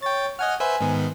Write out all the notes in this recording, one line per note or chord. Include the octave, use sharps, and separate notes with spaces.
C#5 G5 A6
D#5 F#5 G#5 F6
B4 C5 E5 G#5
G#2 D#3 B3